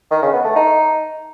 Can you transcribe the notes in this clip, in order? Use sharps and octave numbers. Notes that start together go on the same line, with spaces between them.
D#3
C#3
B3
A3
D#4